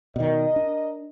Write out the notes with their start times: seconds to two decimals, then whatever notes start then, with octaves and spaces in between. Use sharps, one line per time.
0.16 B2 D#3 A#4 D5 D#5
0.56 D4